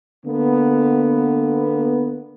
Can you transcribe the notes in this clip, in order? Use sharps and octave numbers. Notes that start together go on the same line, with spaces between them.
D3 A#3 B3